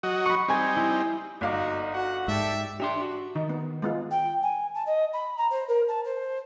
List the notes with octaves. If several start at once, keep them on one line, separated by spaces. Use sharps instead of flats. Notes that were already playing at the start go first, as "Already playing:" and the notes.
F#3 F#4 D#5
B5 C#6
G3 C4 D#4 G#5 C#7
E4
G1 D#4 F#4 F5 D6
F#4 F#5
G#2 G4 A4 D5 E5
D4 G4 C#5 E5 C6
F#4
D#3 D#4
B3
G#3 B3 F4
G5
G#5
A5
D#5
B5
A#5
C5
A#4
A5
C5